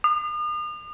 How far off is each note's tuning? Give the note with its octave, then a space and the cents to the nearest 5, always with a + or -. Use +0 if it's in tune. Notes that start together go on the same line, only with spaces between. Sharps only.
D#6 -40